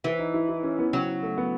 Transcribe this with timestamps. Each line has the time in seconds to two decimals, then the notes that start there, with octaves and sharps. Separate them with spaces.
0.04 E3 E4
0.19 D#4
0.34 E4
0.49 E4
0.63 C#4
0.79 B3
0.93 C#3 F#3
1.23 A3
1.38 B3